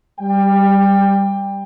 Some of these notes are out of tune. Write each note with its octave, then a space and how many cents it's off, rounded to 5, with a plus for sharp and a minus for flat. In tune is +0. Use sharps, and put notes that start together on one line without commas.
G3 +0 G5 +20